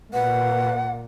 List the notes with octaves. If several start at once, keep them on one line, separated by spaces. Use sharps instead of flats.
A#2 B4 F#5